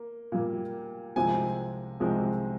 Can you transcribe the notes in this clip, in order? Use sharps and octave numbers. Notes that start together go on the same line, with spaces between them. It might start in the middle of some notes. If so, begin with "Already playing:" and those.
Already playing: A#3
A#2 G3 A#3
C2 C3 F3 G#3 C4 G#5
C2 C3 F3 G#3 C4